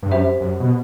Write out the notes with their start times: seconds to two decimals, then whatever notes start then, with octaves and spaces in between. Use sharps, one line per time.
0.03 G2
0.11 F#2 G4 C5 E5
0.40 F#2
0.60 B2